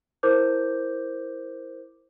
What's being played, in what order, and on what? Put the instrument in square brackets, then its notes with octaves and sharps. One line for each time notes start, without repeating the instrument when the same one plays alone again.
[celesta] E4 A#4 C5 D6 G6